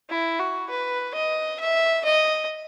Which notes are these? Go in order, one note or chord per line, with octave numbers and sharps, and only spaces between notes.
E4
F#4
B4
D#5
E5
D#5